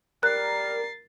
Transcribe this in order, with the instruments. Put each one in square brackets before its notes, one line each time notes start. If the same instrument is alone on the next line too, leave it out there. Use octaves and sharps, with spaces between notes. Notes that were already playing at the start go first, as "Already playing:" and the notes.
[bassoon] G3 [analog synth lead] A#4 [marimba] F#6 [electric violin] A6 C7